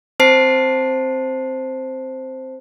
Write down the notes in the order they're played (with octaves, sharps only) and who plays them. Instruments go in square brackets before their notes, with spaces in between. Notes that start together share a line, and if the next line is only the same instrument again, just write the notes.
[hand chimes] C4 C5 A5 C7